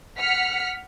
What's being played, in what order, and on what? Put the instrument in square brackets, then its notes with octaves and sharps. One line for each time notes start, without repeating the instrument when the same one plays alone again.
[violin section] F#5 F6 B6 C#7